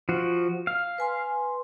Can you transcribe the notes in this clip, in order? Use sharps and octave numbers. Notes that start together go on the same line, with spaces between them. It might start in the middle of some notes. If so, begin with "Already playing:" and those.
F3 F#4
F5
B4 G#5 C6